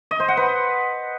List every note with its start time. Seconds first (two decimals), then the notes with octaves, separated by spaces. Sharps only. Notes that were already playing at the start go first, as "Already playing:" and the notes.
0.11 D#5
0.20 C5
0.28 F#5
0.37 B4